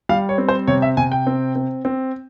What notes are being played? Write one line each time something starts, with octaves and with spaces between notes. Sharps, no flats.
G3 F5
C#5
C4
C5
C3 C#5
E5
C3 G#5
G5
C4
C4
C4